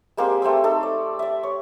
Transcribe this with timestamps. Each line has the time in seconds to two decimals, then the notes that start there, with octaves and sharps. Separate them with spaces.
0.17 G#3 A#3 C4 G4
0.42 A3 C4 C5 E6
0.64 D#4 A4
0.83 D5
1.19 D5 E5
1.43 C#5